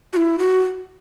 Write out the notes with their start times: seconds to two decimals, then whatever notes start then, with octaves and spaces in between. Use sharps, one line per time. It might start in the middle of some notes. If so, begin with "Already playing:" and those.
0.13 F#4
0.16 E4
0.38 F#4